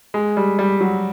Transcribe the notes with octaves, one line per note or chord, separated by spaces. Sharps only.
G#3
G3
G3
F#3